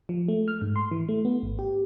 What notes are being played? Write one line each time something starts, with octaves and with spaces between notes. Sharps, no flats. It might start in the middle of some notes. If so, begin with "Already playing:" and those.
F3
A3
F6
G#2
C6
E3
A3
B3
G#1
G4